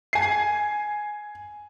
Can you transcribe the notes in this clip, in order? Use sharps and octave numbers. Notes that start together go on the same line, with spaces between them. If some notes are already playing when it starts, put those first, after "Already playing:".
G#5 C7